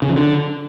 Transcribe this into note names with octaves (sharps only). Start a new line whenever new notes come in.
C#3
F3
D3